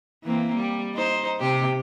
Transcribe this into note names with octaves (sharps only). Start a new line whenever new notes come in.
E3 A#3 C4
G3
D#4 C5
C3 G4